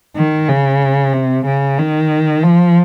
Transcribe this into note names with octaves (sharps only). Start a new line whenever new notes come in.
D#3
C#3
C3
C#3
D#3
F3